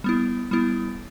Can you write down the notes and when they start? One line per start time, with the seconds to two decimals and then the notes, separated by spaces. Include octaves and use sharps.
0.04 G3 B3 E4
0.51 G3 B3 E4